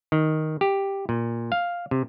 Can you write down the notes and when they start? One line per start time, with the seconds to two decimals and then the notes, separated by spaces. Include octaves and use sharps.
0.12 D#3
0.61 G4
1.09 A#2
1.52 F5
1.91 C3